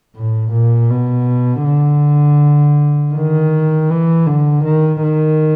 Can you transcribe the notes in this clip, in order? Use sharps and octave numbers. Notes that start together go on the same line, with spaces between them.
A2
A#2
B2
D3
D#3
E3
D3
D#3
D#3